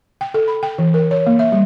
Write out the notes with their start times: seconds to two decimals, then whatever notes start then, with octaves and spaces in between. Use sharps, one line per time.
0.21 G5
0.34 A4
0.48 B5
0.63 G5
0.79 E3
0.94 A#4
1.11 C#5
1.26 A#3
1.39 E5
1.52 G3